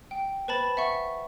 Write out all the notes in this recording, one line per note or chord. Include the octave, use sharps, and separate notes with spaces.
G5
B4 C5 A5 B5 A6
E5 F#5 C#6